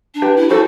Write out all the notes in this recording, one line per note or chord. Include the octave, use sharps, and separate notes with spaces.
D4
G4 B4
E4
F#4 A4 C5